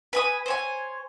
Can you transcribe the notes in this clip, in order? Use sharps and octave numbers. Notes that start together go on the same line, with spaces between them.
B4 G#5 D#6
C5 C#5 G#5